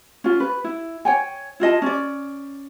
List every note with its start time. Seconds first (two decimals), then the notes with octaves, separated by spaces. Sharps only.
0.24 C#4 F4
0.40 B4
0.64 E4
1.05 C#5 G5 G#5
1.60 E4 F4 D#5 A5
1.82 C#4 D5